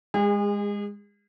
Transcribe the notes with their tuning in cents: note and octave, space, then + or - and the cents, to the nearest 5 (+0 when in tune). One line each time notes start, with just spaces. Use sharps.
G#3 -15 G#4 -40